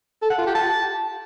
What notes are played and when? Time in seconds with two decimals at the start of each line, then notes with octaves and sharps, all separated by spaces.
0.22 A4
0.30 F#5
0.39 F4
0.47 G4
0.55 A5